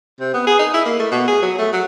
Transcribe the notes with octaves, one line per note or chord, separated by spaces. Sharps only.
C3
B3
G#4
D#4
E4
A#3
A3
B2
G#4
F#3
A3
F#3